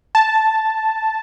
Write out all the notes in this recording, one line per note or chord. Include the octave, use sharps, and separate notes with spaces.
A5